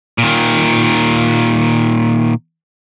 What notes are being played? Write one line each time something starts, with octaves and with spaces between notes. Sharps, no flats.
A#2 D#3